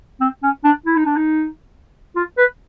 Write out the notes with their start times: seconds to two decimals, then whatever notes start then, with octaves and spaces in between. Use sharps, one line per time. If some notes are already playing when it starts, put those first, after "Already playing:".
0.21 C4
0.43 C#4
0.64 D4
0.86 E4
0.96 D#4
1.06 D4
1.16 D#4
2.16 F4
2.38 B4